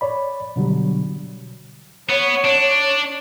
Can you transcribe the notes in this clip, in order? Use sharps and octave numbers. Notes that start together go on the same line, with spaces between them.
C#5 D5 B5
B2 D3 F#3 G3
B3 C#5
D4